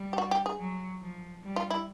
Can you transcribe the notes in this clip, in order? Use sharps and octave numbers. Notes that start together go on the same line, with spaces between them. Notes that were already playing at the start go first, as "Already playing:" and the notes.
Already playing: G3
G4
F#4
G4
G#4
F#3
F3
G3
F4
E4